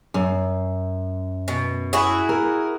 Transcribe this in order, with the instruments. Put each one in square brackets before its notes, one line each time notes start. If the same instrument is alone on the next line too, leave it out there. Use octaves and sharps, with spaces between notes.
[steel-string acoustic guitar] F#2
[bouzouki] B2
E4 F#4 G#4
[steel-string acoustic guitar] A#4